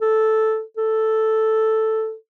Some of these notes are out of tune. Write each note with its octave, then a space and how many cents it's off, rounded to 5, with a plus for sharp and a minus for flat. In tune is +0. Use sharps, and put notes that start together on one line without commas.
A4 -5
A4 +0